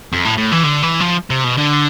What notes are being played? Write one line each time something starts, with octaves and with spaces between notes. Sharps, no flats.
F2
A2
A2
E3
D3
E3
F3
C3
B2
D3